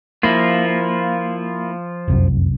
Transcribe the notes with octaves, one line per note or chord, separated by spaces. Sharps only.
F3 A#3 E4 F4
F1 C2 F#2